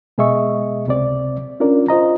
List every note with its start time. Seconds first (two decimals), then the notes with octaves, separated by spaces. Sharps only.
0.18 B2 G#3 G#4 D#5 E5 C#6
0.87 C#2 C3 C4 D5
1.60 C#4 D4 F4 A#4 D5
1.88 F4 C5 D#5 A#5